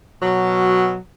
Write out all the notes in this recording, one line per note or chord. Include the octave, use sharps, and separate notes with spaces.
B2 F#3